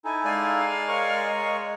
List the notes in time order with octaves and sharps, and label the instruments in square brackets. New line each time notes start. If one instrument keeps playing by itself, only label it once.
[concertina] D#4 E4 A4 [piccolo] G#5
[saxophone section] G#3 [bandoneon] D5 G#5 [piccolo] F5
[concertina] A#4 C#5 C#6